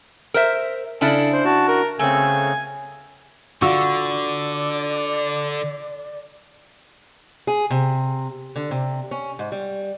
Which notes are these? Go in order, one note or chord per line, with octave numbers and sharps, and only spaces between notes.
A#4 C5 E5
C#3 D4 E4 A4
C5
F#4 A5
A#4
C#3 A3 C4 G#5
D3 F4 F#4 D5 C#6 E6
G#4
C3
D3
C3
C#4
G#2
G3